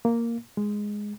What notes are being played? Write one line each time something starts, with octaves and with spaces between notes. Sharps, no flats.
A#3
G#3